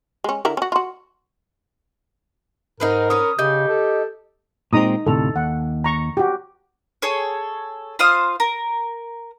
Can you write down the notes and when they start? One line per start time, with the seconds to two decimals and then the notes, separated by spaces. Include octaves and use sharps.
0.24 G#3 C#4
0.45 D3 E4 A#4
0.57 C#4 F#4
0.72 F4 F#4
2.80 G#2 D#4 G#4 A#4 B4
3.10 C#4 B4 C#5 D#6
3.39 C#3 D#4 G4 G6
3.68 A4
4.73 A#2 G#3 C4 D#4 A#5 D#6
5.06 D2 A2 C3 A4
5.36 D#2 F#5
5.84 A#5 C#6
6.17 F#4 G4
7.02 G#4 A4 C#5
7.99 F4 C5 F5 D#6
8.40 A#4